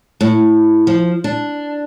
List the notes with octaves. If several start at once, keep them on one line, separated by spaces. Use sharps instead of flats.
A2
F3
D4